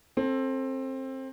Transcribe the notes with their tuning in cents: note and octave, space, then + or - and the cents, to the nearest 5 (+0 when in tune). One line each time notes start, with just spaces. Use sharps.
C4 +20 A4 +0